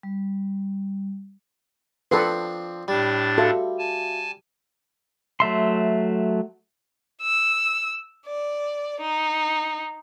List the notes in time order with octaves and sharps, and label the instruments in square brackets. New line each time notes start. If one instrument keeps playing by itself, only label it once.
[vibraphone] G3
[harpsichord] F3 C4 D4 [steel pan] A4 B4 [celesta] C7
[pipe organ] A2 D4 A6 [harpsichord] G3
[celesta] F#4 E5 F5 [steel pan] A4
[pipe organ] G#5 A5
[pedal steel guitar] F#3 A3 E5 C6
[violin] E6
D5
D#4